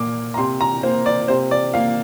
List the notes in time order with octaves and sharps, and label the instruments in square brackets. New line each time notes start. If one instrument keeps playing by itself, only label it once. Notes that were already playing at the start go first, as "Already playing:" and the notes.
Already playing: [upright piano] A#2 A#3 D6
A#5
C3 C6
A#5
A#3 C5
D5
C3 C5
D5
A#3 F5